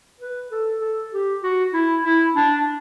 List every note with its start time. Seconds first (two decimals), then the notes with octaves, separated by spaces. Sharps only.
0.20 B4
0.51 A4
0.81 A4
1.13 G4
1.43 F#4
1.74 E4
2.04 E4
2.35 D4